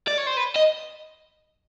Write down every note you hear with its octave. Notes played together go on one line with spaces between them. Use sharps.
D5
C#5
C5
B4
D#5